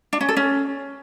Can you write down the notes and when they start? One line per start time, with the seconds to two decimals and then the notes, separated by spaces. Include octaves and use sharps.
0.13 D4
0.21 C#4
0.29 A4
0.37 C#4